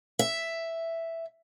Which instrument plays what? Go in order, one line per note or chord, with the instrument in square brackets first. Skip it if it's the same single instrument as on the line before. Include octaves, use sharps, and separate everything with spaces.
[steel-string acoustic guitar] E5